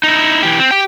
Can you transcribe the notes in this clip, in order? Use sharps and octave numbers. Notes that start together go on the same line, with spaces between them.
D#4 E4
E3 G4
C4
G4 G5